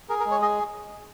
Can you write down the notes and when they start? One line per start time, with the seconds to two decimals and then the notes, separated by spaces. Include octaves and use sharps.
0.09 G#4 A#4
0.20 A#4
0.26 G#3
0.31 C#5
0.42 G#4 D#5